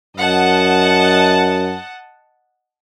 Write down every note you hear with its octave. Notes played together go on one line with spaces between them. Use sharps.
F#2 D#5 F#5 A5